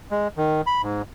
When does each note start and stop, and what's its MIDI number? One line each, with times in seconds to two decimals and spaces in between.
0.11 0.28 56
0.37 0.61 51
0.66 0.82 83
0.82 1.02 44